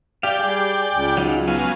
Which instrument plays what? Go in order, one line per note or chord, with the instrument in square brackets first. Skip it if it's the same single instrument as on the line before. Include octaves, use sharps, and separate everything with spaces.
[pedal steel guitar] G4 F5 [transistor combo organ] D5 G5
[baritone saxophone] G3 [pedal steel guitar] G#4
[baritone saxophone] C#2
[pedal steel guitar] F#3 D#4 F4
[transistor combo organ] F#3 B3 F5 [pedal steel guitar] G#5